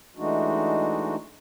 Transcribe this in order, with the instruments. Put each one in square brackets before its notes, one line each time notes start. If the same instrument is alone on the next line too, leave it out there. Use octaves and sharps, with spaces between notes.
[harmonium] E3 G#3 A3 D4 D#4 F#4